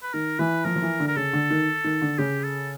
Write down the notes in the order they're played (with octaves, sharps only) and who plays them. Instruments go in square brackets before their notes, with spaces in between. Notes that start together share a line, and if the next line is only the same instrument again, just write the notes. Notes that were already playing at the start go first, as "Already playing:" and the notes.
[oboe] B4
[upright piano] D#3 [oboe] A#4
[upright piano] E3 [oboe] B4
[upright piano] F3 [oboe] A#4
[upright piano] F3
E3
D3
[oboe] A#4
[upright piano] C#3 [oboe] A4
[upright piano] D3
D#3
D#3
D3
[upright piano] C#3 [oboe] G4
[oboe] A4